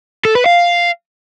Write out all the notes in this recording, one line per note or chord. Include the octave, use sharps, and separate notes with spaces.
A4
B4
F5